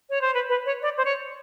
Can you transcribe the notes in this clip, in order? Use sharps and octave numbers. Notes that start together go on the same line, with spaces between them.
C#5
C5
B4
B4
C#5
D5
C5
C#5